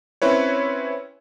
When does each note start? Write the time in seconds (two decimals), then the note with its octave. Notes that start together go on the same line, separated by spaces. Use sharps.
0.22 C4 C#4 E4 B4 C#5